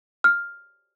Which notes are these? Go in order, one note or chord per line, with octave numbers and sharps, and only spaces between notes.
F6